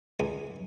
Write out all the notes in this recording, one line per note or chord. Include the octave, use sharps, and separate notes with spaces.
C#2 G#5